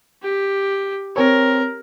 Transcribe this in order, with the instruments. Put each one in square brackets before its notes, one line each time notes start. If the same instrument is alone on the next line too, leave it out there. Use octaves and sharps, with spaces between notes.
[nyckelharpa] G4
[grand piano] C4 C#5 [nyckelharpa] A#4